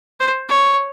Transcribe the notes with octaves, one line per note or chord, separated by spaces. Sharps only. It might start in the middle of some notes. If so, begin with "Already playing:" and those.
C5
C#5